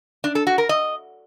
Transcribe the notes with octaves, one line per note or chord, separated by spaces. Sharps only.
D4
A4
F#4
A#4
D#5